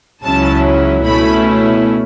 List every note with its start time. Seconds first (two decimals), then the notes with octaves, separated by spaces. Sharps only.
0.24 C#2 C#3 F#3 C#4 E4 A5
1.05 B2 A3 C#4 E4 B5